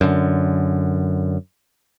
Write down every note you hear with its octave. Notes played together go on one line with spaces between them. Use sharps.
F#2 D3